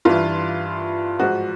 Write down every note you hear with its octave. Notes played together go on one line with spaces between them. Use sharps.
G2 E3 F4
G#2 F3 F#4